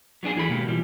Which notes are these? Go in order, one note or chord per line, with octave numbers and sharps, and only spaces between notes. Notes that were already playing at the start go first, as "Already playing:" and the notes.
F#3 B3 D4 G#4
D#2 E3 G#4 A4 B5
B2 G#3 A#3 F#4 G4
B2 E3 F3 G3